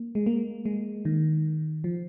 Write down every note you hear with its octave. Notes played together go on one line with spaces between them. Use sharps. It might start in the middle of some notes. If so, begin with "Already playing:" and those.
Already playing: A#3
G#3
A#3
G#3
D#3
F3